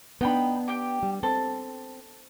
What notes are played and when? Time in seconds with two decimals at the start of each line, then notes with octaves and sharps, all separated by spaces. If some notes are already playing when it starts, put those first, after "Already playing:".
0.21 B3 D4 D#4 G5 B5
0.68 G4 G5
1.03 G3
1.23 C4 A4